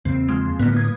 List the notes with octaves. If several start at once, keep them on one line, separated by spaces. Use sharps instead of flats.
E2 C#3 A#3 C4
F3 G#3
A2 D3 G3 A#3 B3
D#6 G#6